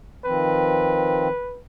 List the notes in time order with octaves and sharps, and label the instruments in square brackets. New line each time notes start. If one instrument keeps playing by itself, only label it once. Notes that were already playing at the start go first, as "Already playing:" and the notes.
[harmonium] D#3 F3 C4 [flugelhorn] B4